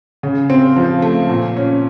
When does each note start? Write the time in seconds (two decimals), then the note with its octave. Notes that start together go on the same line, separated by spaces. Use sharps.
0.23 C#3
0.50 C4
0.76 F3
1.02 A3
1.30 A#2
1.57 C#4